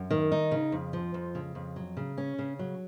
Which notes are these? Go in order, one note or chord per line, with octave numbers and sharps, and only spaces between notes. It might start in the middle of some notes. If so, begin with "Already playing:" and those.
Already playing: F#2
D#3
D#4
C#3
F2
F3
F2
C#3
F2
F#3
C#3
C#4
C#3
F#3